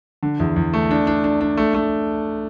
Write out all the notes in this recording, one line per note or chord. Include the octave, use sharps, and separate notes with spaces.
D3
E2
E2
A3
D4
D4
D4
D4
A3
A3